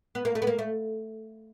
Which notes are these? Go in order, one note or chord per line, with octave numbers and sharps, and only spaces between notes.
B3
A#3
A3
B3
A#3
A3